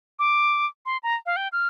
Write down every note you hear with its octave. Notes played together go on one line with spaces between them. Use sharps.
D6
C6
A#5
F5
G5
F6